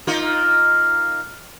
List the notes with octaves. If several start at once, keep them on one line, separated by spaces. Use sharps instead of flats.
A#3 D#4 F4